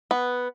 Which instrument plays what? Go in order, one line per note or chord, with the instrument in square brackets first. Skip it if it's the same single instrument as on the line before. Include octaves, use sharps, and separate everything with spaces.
[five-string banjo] B3